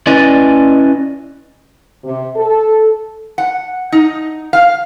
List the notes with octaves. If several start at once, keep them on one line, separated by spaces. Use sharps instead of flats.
C#4 E4 B4 D5 D#5 G#5
C3
A4
F#5
D#4
F5